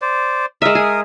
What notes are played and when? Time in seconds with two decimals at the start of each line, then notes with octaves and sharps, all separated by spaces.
0.02 C5 D5
0.62 G#3 A#4 E5 D#6
0.75 G#4